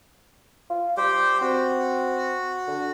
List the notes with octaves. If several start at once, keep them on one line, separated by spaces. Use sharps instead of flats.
F4
G3 G4 C5 G5
C4 F#4
D3